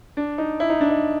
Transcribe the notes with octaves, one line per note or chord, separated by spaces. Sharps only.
D4
D#4
E4
D#4
D4
D#4